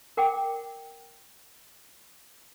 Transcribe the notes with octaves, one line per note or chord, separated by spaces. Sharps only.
A#4 F#5 G5 D6